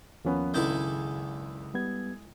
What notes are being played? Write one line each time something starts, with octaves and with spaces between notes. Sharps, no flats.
D#2 F3 A#3 B3 C#4 B4
G#1 C#2 F#2 C#3 G#3 E4 A4 G6
G3 B3 G#6